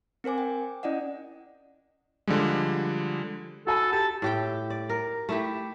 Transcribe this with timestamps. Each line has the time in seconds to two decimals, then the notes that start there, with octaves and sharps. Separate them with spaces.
0.24 C4 A#4 C5 G#5 D6
0.38 G5
0.83 C#4 E4 D5 D#5 F#5
2.27 D3 F3 G3 G#3
3.67 F#4 A4 G#5 B5
3.92 G4 A5
4.22 A2 G4 G5
4.70 D5
4.89 A#4
5.29 A3 E4 G4